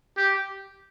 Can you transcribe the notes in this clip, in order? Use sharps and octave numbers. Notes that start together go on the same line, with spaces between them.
G4